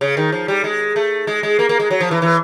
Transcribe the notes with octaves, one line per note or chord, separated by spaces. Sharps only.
C#3
D#3
F3
G3
G#3
A3
G#3
G#3
A#3
A#3
G#3
F#3
F3
E3
E3